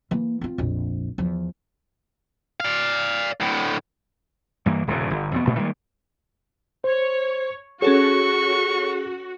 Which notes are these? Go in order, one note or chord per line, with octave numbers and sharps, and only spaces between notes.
E3 A#3
C4 F4
A#1 F2
E2 F3
D5 F5
D2 A2
G2 E3 A#3
D#1 C2 G2 C#3
G1
F2 B2 B3
A1 A#2 A3
D#3 G3 G#3 A#3
C5 C#5
C#4 F#4 G#4 A4 C#5 C#6